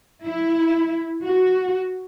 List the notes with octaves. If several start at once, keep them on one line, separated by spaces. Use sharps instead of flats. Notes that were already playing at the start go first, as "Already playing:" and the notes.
E4
F#4